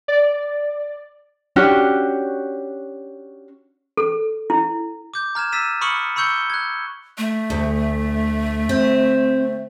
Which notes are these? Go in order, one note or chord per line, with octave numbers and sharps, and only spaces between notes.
D5
C#4 D4 F#4 G4
A4
E4
D6 G6
A#5 F6 G#6 E7
E6 A6 B6 D#7 E7
B5 C#6 D#6 F6 C#7 F#7
B5 C#6 E6 G6 C#7 G7
F#6 G#6
A3
D2
C4